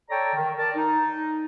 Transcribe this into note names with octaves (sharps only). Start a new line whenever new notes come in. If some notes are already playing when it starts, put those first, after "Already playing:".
A4 C#5 D5 G5 A5 A#5
D#3
A#4 D5 A5
D#4